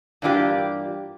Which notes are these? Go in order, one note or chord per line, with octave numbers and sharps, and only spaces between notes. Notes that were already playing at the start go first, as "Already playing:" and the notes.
G2 E3 A#3 D4 F4 G4